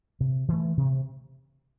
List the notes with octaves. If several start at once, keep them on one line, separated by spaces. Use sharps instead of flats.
C3
E3 A3
C3